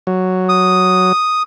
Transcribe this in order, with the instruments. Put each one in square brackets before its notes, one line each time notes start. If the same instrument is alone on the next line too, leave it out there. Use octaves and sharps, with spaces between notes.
[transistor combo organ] F#3
[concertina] D#6